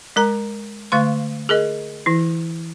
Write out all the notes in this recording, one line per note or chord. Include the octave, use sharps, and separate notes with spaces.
G#3 A#4 A#5
D3 A3 F5 C6
G#4 A#4 D#5
E3 E4